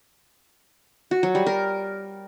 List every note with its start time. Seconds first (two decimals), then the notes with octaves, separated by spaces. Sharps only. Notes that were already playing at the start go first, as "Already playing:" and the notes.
1.11 F#4
1.23 F#3
1.35 G3
1.46 A#4